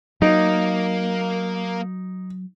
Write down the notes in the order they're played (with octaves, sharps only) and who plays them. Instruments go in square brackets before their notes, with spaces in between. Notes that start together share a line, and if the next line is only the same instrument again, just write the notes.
[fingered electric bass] F#3 [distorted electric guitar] A#3 [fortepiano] D#4